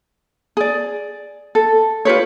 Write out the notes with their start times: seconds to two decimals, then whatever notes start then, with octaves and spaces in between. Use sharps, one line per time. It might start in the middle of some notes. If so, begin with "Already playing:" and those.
0.57 G#4 D5
1.55 A4
2.05 F4 G4 B4 C#5